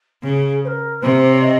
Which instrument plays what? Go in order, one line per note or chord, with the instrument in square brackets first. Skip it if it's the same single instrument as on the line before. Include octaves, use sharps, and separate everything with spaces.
[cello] C#3 [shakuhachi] G#4
[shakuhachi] C5
A#4
[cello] C3 [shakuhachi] C5
[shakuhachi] C#5
D#5